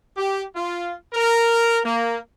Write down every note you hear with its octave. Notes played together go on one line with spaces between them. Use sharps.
G4
F4
A#4
A#3